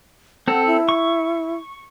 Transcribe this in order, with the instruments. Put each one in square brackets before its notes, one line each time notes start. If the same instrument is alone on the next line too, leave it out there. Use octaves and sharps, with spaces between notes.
[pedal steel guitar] C4 A4 [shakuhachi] F#5
[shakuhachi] E4
[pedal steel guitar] C#6